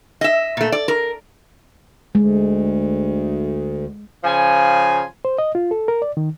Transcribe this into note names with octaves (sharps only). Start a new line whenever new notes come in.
D#5 E5
A#2 A3
D5
A#4
D2 G#3
C#3 F3 G#5
C5
D#5
F4
A4
A#4
D5
D#3